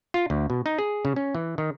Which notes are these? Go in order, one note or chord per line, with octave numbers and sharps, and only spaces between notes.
F4
D2
B2
D#4
G#4
C#3
C#4
E3
D#3